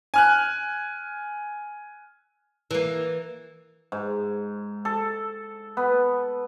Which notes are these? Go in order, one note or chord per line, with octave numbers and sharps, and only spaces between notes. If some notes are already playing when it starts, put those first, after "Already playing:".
G#5 F6 F#6
E3 A#3
G#2
A4
B3